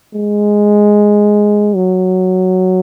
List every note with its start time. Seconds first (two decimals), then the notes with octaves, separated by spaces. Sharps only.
0.14 G#3
1.75 F#3